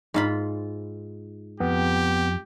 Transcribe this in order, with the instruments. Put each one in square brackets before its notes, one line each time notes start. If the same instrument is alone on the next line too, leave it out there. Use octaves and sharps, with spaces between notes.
[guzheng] G#2 F4 B5
[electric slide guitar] F2 [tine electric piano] B3 [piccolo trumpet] G4